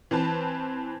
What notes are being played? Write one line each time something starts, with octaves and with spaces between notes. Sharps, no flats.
E3 C4 B4 A5